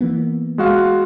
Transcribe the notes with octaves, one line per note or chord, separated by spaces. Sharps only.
E3 A#3 B3
G#3 F#4 F5